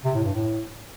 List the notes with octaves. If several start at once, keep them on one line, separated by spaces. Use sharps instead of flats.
C3
A2
G2
A2